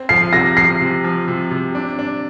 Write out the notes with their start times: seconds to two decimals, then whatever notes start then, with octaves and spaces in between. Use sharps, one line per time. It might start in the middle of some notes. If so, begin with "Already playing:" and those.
Already playing: C4
0.09 F3 C7
0.33 C3 A#6
0.57 F3 C7
0.81 C3
1.04 F3
1.28 C3
1.51 C3
1.75 D4
1.99 D4